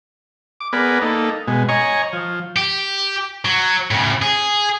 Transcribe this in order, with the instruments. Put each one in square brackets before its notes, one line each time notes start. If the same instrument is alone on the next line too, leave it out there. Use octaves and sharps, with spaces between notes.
[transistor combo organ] D6
B3 G#4 A#4 B4 D5
A#3 D#4 A4
B2 G#3
C#5 D#5 G#5 A#5 C#6
F3
[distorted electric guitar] G4
F#3
A2 C#3
G#4